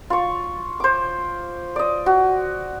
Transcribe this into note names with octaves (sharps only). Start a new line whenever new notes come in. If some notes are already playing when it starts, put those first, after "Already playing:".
F4 C#6
C5 D6
D5 D#5
F#4